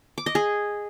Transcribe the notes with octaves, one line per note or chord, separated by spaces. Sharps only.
D6
D#5
G#4